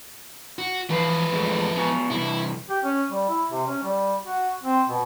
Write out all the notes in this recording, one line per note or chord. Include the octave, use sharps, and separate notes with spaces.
F#4
E3 F3 B4 F5
E2 G#3 A3
B3 F#4 G#5
C3 E3 G3 E4
G4
C#4
G3
E4
C3
C#4
G3
F#4
C4
B2